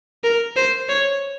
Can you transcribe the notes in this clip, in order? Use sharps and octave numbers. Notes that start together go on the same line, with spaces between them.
A#4
C5
C#5